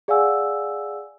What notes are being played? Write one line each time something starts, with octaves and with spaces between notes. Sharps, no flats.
G#4 D5 F5 F#5 G#5 E6